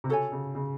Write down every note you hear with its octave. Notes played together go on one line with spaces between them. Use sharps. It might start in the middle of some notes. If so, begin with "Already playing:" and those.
C3
C#3 F#4 A4 C#5 G#5
C#3
C#3